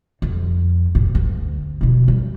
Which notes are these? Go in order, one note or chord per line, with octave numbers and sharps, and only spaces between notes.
F2
G#2
D2
B2 E4
G3